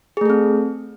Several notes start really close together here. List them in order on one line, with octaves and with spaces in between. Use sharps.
G#4 A3 A4 C4